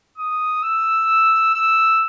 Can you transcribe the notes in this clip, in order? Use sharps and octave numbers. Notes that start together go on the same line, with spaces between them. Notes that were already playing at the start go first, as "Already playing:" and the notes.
D#6
E6
E6